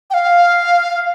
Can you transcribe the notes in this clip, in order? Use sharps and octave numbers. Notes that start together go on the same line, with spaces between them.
G5
F5